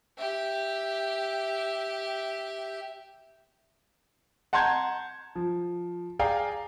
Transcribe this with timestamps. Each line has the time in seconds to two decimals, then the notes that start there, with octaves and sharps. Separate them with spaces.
0.18 G4 E5
4.53 F#5 A5 A#5 C6 G6 G#6
5.36 F3
6.19 G#4 D5 F5 G5 G#5 A#5